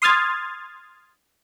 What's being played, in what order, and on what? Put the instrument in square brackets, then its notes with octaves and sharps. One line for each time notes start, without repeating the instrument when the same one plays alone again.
[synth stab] C6 D#6 F6 G#6 A6